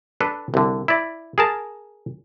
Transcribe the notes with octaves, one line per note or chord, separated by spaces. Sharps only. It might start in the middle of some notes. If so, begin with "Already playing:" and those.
D4 A4 B4
C2 D3
E4 D5
G#4 A#4 A5